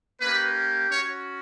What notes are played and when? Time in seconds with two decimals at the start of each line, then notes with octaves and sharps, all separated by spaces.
0.20 A#3 C#4 G4 B4
0.90 C#4 F#4 C#5